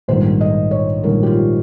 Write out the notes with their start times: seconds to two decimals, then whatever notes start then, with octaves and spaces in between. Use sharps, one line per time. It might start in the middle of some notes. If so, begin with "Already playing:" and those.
0.08 A#1 G#2 D#3 G3 C5
0.41 D#5
0.71 C#5
1.03 A#1 G#2 D#3 G3 A#4
1.23 G4
1.26 F4